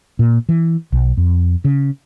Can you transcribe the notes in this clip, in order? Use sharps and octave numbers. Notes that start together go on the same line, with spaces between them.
A#2
E3
B1
F2
C#3